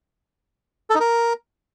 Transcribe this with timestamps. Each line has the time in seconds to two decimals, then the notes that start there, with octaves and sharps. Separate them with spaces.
0.90 A4
0.95 D#4
1.00 A#4